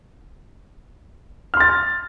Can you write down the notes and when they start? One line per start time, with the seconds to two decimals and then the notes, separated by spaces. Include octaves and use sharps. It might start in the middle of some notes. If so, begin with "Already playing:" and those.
1.54 F6
1.57 C6
1.60 A6